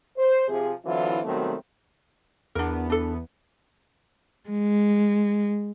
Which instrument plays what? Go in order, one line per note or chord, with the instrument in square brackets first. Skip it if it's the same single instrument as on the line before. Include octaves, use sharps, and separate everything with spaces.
[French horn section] C5
C3 F3 G#4
D3 E3 F#3 C4 E4 F4
B2 D#3 F#3 G3 A3 C4
[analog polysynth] E2 B3 [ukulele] D4 A#4
[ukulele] D4 A4
[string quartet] G#3